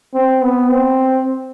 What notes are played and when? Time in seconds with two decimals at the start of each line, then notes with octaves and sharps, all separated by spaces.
0.14 C4
0.42 B3
0.69 C4